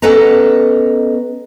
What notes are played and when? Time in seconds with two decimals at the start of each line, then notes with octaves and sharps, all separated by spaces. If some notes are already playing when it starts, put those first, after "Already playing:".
0.02 B3 C#4 A4 B4 D#5 A#5